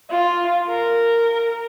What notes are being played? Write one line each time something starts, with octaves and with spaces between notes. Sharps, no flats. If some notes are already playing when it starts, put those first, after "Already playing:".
F4
A#4